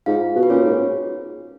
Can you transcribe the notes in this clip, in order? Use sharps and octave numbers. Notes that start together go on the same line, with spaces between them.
G#2 F4 F5
B2
B4
A#2 C#4 C#5
G#2